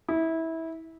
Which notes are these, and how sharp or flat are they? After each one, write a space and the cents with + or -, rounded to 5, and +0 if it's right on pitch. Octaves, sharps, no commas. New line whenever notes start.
E4 -20